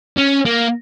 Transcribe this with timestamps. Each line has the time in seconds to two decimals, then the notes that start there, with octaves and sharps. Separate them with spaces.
0.17 C#4
0.46 A#3